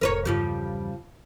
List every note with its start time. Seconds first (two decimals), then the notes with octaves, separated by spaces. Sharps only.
0.01 F1 A2 A#4 B4 C#5
0.25 E2 G2 C#3 F3 G3